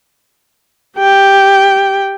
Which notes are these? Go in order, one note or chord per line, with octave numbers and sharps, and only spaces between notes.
G4 G5